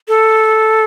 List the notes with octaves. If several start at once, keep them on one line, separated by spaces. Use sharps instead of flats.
A4